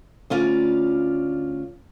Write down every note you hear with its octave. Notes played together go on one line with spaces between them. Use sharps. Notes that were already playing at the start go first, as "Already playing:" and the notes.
D2 C#4 F4 D5